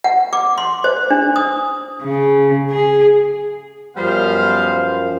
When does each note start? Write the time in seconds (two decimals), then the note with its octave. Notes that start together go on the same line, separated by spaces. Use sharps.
0.04 F#5
0.33 D6
0.58 C6
0.84 C5
1.10 D4
1.36 D#6
2.03 C#3
2.71 G#4
3.97 F#2 F3 G3 B3 C5 F5